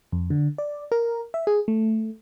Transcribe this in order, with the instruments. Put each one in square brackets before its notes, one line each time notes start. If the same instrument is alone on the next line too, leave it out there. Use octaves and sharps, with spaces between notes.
[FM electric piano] F2
D3
D5
A#4
E5
G#4
A3